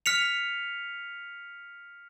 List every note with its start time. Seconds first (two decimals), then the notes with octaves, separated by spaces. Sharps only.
0.06 F6 B6 C#7 F7